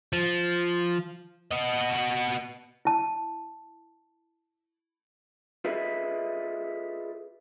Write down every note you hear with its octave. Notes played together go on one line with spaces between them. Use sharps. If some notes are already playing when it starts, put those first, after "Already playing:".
F3
B3 D#5
E4 A5
F4 G#4 A4 B4 D#5 E5